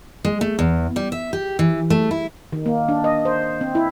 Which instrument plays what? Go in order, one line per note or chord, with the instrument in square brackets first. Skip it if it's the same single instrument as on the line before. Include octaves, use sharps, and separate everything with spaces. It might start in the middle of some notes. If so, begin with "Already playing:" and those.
[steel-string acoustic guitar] G#3
A3
E2
G3
E5
G4
E3
A3
E4
[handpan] D#3
A#3
D4
D#5
C5
C4
E4